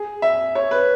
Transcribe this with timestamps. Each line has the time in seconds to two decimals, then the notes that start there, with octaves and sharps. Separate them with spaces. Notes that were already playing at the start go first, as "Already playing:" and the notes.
Already playing: G#4
0.22 E5
0.55 C#5
0.71 B4